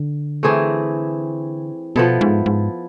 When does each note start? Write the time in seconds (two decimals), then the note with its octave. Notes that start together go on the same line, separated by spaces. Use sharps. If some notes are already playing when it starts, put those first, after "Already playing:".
Already playing: D3
0.43 E3 A3 C4 G#4
1.96 B2 F3 B3 E4 A4
2.21 G#2
2.46 G#2